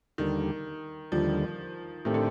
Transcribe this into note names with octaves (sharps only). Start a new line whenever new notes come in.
D#2 D3 D#3 G3
D#2 D3 F3 G3
A2 D#3 A3 C4 G4
D3